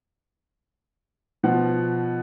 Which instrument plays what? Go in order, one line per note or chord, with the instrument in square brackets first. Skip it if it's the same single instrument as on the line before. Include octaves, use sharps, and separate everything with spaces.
[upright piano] B2 F3 F#5